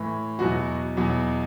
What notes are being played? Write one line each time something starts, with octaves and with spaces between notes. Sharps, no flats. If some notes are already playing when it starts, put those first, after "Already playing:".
Already playing: A2 E3
E2 B2 F#3 F#4
E2 B2 F#3